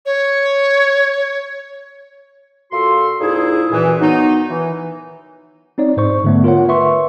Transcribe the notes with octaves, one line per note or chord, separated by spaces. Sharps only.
C#5
A#2 F4 F#4 A4 C6
F2 A#2 D#4 E4 G#4
F#2 A#2 E3
D#3 F#3 B3 D#4
E3
C4 D#4 C#5 D5
G#2 C5 C#6
D3 A3 B3
F4 A#4 C#5 F#5
B4 E5 C6 C#6